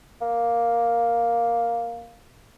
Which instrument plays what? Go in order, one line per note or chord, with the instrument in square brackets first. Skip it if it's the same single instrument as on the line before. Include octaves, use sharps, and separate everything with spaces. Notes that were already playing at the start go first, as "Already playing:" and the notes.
[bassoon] A#3